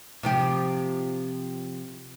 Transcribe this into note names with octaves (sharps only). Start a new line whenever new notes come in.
C3 F3 G4